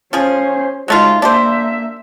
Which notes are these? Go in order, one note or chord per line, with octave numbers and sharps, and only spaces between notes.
F3 C#4 G#4 C5
F#3 G#3 A3 D#4 F4
A#3 D4 G4 C5 E5